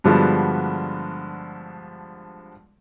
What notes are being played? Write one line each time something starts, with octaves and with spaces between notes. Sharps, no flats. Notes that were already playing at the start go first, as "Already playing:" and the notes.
G2 D3 F3 G#3 B3 F#4